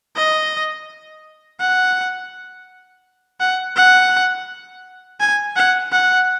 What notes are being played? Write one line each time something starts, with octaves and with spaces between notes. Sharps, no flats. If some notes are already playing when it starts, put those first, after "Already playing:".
D#5
F#5
F#5
F#5
G#5
F#5
F#5